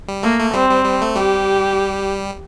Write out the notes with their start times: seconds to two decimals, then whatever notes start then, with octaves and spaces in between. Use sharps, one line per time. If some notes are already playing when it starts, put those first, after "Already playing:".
0.08 G3
0.23 A3 A#3
0.39 A3
0.54 G3 C4
0.69 G3
0.85 G3
1.01 A3
1.16 G3 G4